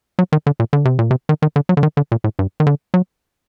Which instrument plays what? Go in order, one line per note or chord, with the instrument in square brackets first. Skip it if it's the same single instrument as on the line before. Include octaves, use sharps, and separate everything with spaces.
[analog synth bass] F#3
D#3
D3
A#2
D3
C3
A#2
C3
D#3
D#3
D3
F#3
D3
D#3
D3
A#2
A2
G2
D#3
D3
F#3